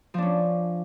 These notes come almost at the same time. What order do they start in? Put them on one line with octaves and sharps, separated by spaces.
F3 D4 C#4